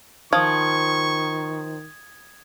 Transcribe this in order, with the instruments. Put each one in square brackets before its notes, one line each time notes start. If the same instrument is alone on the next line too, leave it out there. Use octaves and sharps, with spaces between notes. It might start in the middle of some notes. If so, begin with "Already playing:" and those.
[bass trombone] D#3 [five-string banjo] F3 [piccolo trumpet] C#6 [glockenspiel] D#6 G#6